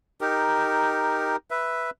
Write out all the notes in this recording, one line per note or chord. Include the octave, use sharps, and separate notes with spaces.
D#4 G4 A#4
B4 E5